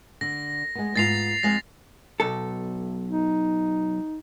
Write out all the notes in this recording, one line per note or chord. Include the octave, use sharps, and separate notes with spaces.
D3 A#6
G#3 B3
G#2 B3 F4 A6 C7 F7
F2 G#3 F5 A#6
B1 A4
D#4